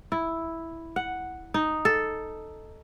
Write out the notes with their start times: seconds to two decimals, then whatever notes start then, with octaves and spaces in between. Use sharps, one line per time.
0.12 E4
0.96 F#5
1.54 D#4
1.85 A4